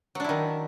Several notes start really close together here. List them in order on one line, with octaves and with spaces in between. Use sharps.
F#3 D4 E4 D#3